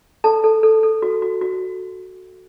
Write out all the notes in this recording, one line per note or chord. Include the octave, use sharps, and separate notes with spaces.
A4 A5
A4
A4
A4
F#4
F#4
F#4